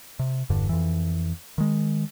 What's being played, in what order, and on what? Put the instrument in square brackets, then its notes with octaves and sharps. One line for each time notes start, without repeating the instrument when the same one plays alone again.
[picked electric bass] C3
E1 G2 D3
F2 E3
D#3 G#3